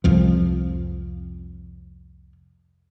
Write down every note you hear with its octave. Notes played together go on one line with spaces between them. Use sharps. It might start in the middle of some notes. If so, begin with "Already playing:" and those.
C2 F2 F3